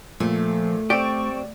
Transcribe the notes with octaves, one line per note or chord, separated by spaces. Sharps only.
A#2 F3 A3
C4 G4 D5 C#6